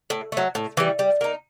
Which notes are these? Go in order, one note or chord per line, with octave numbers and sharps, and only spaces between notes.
A2
F#3 A3
A2
E3 G3
G3
A#3 D#4